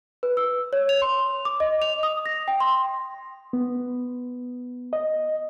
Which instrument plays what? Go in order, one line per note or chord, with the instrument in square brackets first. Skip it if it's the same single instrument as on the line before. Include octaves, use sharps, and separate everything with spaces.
[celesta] B4
E6
C#5
F7
C6
D6
D#5
F7
D#6
A#6
G5
C6
[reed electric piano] B3
D#5